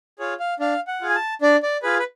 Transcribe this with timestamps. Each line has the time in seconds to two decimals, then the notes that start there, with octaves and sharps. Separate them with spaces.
0.19 F4 G#4 C#5
0.40 F5
0.60 D4 F5
0.88 F#5
1.01 F4 G#4
1.09 G#5
1.15 A5
1.42 D4 D5
1.63 D5
1.83 F4 G#4 B4
1.99 B4